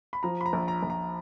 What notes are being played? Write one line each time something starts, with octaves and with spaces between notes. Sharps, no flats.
B5
F3 A#5
B5
A#5
A#1
A#5
A#1
A#5